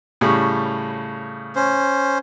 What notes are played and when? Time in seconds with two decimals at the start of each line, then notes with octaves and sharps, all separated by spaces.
0.21 A2 C#3 G3
1.56 C#4 C5